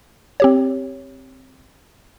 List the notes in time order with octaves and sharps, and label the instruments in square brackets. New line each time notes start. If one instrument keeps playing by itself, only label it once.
[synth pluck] C4 G4 C#5